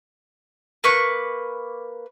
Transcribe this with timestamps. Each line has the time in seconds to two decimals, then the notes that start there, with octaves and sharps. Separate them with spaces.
0.84 A#3 B4 C#6 F#6